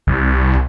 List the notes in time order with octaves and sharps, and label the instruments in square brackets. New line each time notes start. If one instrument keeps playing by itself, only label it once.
[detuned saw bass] C2